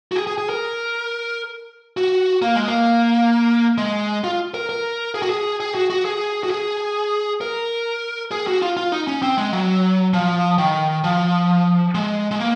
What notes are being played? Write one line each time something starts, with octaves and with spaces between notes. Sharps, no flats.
F#4
G#4
G#4
G#4
A#4
F#4
A#3
G#3
A#3
G#3
F4
A#4
A#4
G#4
F#4
G#4
G#4
F#4
F#4
G#4
F#4
G#4
A#4
G#4
F#4
F4
F4
D#4
C#4
C4
G#3
F#3
F3
D#3
F3
G#3
G#3
A#3